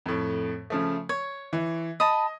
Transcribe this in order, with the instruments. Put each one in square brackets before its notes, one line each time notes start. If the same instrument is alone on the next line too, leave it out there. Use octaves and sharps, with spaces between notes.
[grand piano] F2 A2
C#3 F3 A3
[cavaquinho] C#5 [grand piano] G#6
[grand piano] E3
[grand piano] D#5 [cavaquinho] A5 B5 D#6